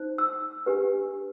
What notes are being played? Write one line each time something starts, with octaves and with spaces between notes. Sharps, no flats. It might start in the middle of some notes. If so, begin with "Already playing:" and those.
Already playing: D#4 C5
E6
D4 G4 B4